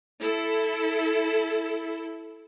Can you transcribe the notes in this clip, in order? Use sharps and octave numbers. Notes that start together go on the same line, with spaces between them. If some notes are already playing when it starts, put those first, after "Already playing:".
E4 A4